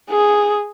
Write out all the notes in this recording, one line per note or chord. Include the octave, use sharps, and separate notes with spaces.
G#4